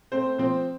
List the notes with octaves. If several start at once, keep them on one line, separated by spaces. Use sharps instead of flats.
A3 C4 C5
F3 C4 C5